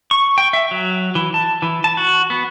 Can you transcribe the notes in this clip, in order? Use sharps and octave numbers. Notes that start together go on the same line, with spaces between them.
C#6
G5
E5
F#3
E3
A5
E3
A5
F#4
B3